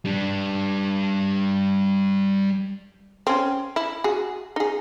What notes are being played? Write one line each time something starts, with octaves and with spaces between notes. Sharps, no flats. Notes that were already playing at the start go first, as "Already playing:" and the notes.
G3 D4
C4 C#4
E4
F#4 G#4
D#4 G#4